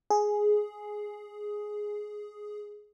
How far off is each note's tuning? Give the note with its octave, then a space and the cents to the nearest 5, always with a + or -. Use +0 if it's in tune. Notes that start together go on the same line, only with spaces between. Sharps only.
G#4 +5